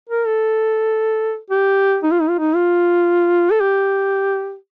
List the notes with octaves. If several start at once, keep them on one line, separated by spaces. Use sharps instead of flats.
A#4
A4
G4
D#4
F4
D#4
F4
D#4
F4
A4
G4